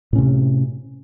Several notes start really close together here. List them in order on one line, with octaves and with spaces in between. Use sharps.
A2 C#4 C3